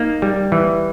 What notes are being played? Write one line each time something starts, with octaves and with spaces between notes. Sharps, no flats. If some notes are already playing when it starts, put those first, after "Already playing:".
Already playing: A#3 D#4
G3
E3